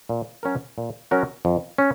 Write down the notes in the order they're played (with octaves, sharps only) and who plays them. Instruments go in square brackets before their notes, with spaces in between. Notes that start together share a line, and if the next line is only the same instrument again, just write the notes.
[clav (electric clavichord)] A#2
F#3 C#4 F#4 A#4
A#2
F#3 C#4 F#4 A#4
F2
C#4